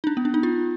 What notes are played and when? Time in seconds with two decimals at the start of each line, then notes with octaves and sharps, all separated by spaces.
0.04 D#4
0.07 D4
0.17 B3
0.25 D4
0.34 D#4
0.43 F4